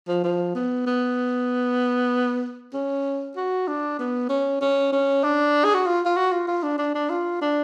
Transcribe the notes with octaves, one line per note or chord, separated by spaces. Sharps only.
F3
F3
B3
B3
C#4
F#4
D4
B3
C#4
C#4
C#4
D4
G#4
F#4
F4
F4
F#4
F4
F4
D4
D4
D4
F4
D4